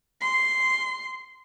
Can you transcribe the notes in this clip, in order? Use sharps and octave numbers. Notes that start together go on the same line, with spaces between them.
C6